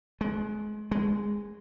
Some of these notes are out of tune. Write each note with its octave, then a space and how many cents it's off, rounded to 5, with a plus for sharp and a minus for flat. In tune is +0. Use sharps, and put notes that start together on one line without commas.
G#3 +25
G#3 -10